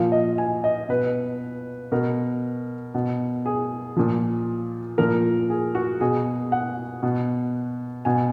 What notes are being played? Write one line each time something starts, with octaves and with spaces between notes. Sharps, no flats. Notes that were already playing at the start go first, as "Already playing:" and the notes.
Already playing: A#2 F3 F5
D#5
G#5
D#5
B2 B4
B2 A#4
B2
G#4
A#2 F3
A#2 F3 A#4
G#4
F#4
B2 G#4
F#5
B2
B2 G#5